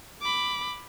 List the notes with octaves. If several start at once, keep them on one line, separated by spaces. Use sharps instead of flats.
B5 D6